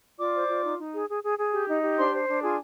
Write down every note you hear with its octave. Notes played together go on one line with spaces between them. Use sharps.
F4 D5 D6
C5
F4
D#4
D#4
G#4
G#4
G#4
G#4
G4
D#4
G4
D4 C5 C6
C5
D4
F4 G#4 G#5